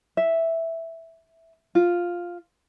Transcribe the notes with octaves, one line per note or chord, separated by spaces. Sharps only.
E5
F4